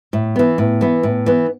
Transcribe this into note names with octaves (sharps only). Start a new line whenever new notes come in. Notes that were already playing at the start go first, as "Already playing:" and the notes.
A2
E3 B3
A2
E3 B3
A2
E3 B3